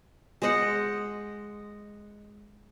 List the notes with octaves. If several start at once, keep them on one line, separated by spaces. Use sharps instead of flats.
G#3 C5 D#5 F#5